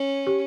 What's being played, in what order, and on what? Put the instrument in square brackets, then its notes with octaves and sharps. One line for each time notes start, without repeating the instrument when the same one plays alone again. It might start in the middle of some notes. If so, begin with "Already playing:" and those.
Already playing: [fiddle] C#4
[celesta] G4